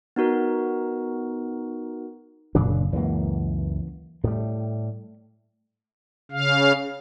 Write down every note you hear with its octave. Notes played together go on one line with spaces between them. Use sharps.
B3 D#4 F#4 A#4
F#1 A#2 C#3 D4
C#2 F#2 E3 A#3
A2 G3 A3
C#3 F5